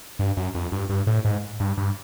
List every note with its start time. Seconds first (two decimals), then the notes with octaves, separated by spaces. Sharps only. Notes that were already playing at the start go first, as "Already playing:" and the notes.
0.19 G2
0.37 F#2
0.55 F2
0.72 G2
0.89 G2
1.07 A2
1.25 G#2
1.60 G2
1.78 G2